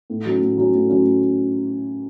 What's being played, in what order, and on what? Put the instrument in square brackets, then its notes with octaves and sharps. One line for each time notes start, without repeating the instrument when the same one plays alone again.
[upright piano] A2
F#3 C#4
A2
F#3 C#4
A2
F#3 C#4
A2